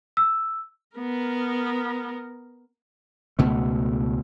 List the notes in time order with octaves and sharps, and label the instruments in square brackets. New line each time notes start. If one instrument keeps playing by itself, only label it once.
[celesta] E6
[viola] B3 A#4
[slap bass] C#2 B2 A3